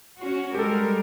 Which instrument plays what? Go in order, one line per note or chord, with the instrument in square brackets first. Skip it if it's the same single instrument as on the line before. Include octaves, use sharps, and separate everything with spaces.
[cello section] C#4 F#4
[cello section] G3 G#3 A#4 [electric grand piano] G4 A4